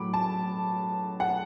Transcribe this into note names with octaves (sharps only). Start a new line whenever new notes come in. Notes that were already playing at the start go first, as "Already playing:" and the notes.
Already playing: A2 F#3 A3 B5 D6
A5
F#5